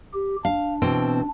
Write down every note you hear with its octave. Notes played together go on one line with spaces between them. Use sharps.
G4
D4 F5
B2 E3 C4